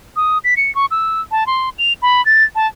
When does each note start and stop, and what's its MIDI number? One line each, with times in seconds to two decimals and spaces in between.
0.16 0.38 87
0.44 0.54 95
0.57 0.73 97
0.75 0.86 85
0.91 1.21 88
1.31 1.47 81
1.47 1.70 84
1.78 1.93 101
2.02 2.24 83
2.25 2.44 93
2.55 2.67 81